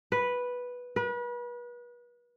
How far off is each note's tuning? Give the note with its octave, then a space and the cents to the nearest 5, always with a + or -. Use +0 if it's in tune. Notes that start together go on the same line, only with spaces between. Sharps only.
B4 -5
B4 -35